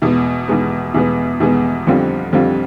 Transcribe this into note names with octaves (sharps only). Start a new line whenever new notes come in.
E2 B2 G#3 B3
E2 B2 G#3 B3
E2 B2 G#3 B3
E2 B2 G#3 B3
F2 D3 G3 C4 F4
F2 D3 G3 C4 F4